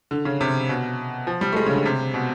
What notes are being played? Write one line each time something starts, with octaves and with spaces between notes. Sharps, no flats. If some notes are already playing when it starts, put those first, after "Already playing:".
D3
C#3
C3
B2
F3
G3
A3
G#3
C#3
D3
C3
B2